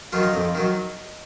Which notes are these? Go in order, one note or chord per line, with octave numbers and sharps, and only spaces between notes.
D#3 F#3 F4
D#4
F2
D#3 F#3